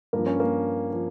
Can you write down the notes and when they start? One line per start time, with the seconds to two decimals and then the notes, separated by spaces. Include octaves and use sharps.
0.13 G2 F3 A#3
0.27 C#4
0.40 A#3
0.93 F3